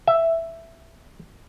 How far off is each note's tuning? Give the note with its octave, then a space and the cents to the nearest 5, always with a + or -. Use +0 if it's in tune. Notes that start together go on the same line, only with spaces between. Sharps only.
E5 +5